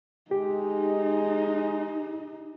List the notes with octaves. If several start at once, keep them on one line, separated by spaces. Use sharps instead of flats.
G#3 D#4 G4